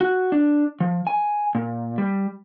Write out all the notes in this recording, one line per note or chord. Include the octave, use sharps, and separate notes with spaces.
F#4
D4
F3
G#5
A#2
G3